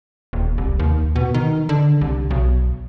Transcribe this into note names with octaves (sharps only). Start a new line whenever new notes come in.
D#1
C2
D#2
B2
D#3
D3
C2
B1